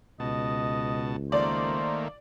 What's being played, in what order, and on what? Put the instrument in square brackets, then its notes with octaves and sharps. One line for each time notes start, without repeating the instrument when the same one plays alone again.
[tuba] C#2 [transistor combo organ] B2 A5 [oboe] D#5
[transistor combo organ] D#3 A3 A#3 [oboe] C5 [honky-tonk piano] D5